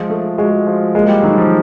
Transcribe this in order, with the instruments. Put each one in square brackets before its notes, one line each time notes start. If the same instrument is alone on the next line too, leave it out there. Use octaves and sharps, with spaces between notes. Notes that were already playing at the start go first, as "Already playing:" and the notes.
Already playing: [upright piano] F3 F4 [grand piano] G#3
[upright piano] A3
[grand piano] G#3 [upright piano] F#4
[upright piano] F3
[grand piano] G#3 [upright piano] A#3
[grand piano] G3
[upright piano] D#3 [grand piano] F#3
[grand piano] F3